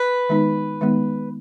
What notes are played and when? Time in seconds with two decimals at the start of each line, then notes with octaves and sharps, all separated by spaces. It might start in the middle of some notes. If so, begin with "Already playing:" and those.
Already playing: B4
0.29 D#3 G#3 B3 D#4
0.81 D#3 G#3 B3 D#4